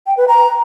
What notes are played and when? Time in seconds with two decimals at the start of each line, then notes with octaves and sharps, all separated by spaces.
0.07 G5
0.17 B4
0.28 A#5